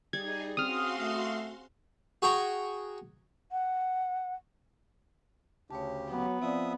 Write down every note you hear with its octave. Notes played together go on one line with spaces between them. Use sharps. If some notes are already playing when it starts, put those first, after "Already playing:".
G3 D#4 G#4 D5 G#6
C4 C#4 F#4 G#4 F5 C6 D#6 F6
A3
F#4 G#4 G5 A#5 C#6
F#5
D2 C#3 G4 C#5 A5
F#3 B3
F3 C4 D5 E5 D#6